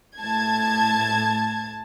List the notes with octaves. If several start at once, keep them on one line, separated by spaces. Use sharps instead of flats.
A2 A5 G#6